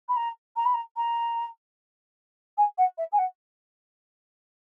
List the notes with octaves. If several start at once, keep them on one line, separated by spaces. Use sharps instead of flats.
B5
A#5
A#5
B5
A#5
A#5
G#5
F#5
E5
G#5
F#5